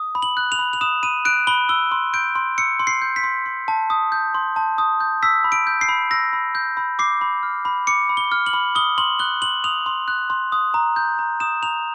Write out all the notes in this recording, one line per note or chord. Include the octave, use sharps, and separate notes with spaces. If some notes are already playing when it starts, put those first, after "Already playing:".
Already playing: D#6
B5
F#7
F#6
F7
B5
F7
D#6 E7
B5 D#7
F#6 D7
B5 G7
E6 G7
C6
G6 D7
C6
E6 C#7
C6
C7
G6
B6
C6
C6
A5
D#6
G6
C6
A5
D#6
G6
E6 B6
B5
D7
G6
C7
B5
E6 A#6
B5
G6
B5
D6 C7
B5
F6
B5
D6 C#7
B5
G7
F6
F#7
B5
D#6 G7
C6 F#7
F#6 G7
C6 F#7
D#6 F7
C6
F#6
C6
D#6
A#5
G6
A#5
D#6 E7
A#5 F7